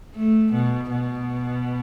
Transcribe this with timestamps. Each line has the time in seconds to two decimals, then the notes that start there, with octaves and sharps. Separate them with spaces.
0.15 A3
0.53 B2
0.90 B2